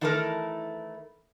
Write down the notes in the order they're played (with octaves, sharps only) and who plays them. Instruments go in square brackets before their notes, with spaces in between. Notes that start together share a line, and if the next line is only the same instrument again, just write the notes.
[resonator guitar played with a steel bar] D#3 E3 A3 E4 A4 A#4